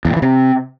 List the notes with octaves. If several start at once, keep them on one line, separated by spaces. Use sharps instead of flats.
E2
A#2
E3
C3